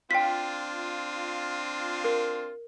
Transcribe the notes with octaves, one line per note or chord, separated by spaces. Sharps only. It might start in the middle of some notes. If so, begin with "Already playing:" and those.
C4 D4 F4 G5 B6
A#4